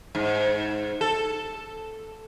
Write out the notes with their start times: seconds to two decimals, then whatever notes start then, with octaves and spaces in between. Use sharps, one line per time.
0.15 G#2
1.01 A4